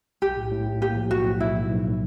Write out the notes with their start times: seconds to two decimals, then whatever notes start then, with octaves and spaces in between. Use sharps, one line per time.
0.22 B1 G4
0.37 A2
0.51 A2
0.66 A2
0.81 A#3 G4
0.96 F3
1.11 B1 F#4
1.25 A2
1.40 B1 E4
1.55 B1
1.70 B1